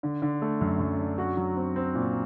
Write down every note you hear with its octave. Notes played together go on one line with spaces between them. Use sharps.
D3
D3
A3
F#2
F#2
D4
F#4
F#3
C4
C4
A#2